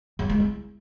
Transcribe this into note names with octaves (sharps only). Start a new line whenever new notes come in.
F#3
G#3
E4